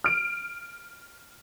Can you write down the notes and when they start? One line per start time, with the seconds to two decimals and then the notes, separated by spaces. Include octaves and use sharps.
0.04 F6 D7